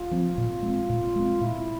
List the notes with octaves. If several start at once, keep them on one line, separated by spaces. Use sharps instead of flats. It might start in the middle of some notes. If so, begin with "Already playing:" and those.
Already playing: F4
F3 C4
A#2
G#3 C4
A#2
G#3 C4
A#2 E4